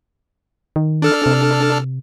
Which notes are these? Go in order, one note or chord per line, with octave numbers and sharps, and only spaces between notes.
D#3
D4 A4 F6
C3